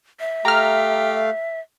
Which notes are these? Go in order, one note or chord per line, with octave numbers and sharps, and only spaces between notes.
E5
A3 G4 F5 A#5 F6